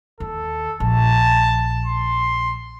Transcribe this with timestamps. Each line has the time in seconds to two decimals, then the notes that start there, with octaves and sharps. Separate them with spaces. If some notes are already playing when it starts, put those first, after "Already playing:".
0.20 D#2 A4
0.80 A#1 A5
1.86 C6